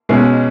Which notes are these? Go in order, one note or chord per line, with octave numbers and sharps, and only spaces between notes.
B1 B2 G#3 C#4